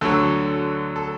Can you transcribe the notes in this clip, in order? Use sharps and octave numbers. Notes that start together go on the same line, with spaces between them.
D2 D3 F#3 A4
A4